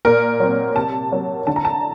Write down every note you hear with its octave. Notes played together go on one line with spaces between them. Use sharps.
A#2 A#4
F#3 C4
C3 A5
F#3 A#3
D3 A5
A#5
A5